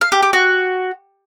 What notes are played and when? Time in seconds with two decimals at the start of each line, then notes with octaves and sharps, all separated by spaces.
0.01 F5
0.12 G4
0.23 G4
0.33 F#4